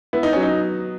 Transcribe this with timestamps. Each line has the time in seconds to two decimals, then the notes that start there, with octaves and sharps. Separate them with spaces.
0.13 B3 E4
0.23 D#4
0.33 F#3 C#4
0.43 D#4